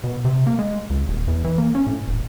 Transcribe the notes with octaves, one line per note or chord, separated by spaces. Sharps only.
B2
C3
A#3
G#3
C#2
D#1
E2
E3
A#3
C#4
A2
E1